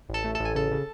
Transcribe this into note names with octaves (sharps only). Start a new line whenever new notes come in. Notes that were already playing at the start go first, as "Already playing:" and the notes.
A1
A4 A5
A3
A4 A5
A1
G#5
C#3 A4 A5
C#3